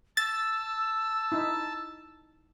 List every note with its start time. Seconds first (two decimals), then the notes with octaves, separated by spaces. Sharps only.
0.17 A5 E6 A6
1.32 D#4 E4